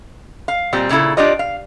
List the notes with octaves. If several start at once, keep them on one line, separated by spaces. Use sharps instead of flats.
F5
A#2 G3 C4
A#2 C#3 A#3 E4 A4
D4 F4 G4 D5 D#5
F5